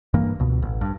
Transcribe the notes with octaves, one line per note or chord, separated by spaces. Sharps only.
G2 E3 A#3
C#2 B2
A1
G2